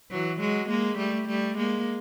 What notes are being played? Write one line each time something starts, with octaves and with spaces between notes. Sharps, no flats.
E3 F#3
F#3 G#3
G#3 A#3
G3 A3
G3 A3
G#3 A#3